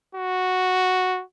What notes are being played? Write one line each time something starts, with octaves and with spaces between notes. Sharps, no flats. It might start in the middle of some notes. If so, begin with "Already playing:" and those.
F#4